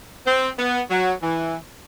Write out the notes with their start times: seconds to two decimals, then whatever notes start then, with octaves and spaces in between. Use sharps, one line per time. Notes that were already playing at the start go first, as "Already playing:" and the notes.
0.26 C4
0.58 B3
0.90 F#3
1.22 E3